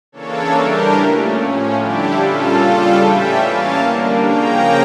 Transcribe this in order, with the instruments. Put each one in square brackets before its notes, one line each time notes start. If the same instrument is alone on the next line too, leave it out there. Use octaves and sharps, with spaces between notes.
[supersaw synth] C#3 E3 A#3 D4 A4 C#5
E3 G3 D4 G4 A#4
A#2 A3 C#4
A2 F3 C#4
D3 G3 D4 E4 G4
A#2 G3 C#4 F4 A4
C#3 G3 D4 F4 A4
A2 E3 G3 C#4 E5 G5
E3 A#3 C#4 F5 A5
D3 G3 A#3 D4
C#3 F3 A#3 C#4 G5 A#5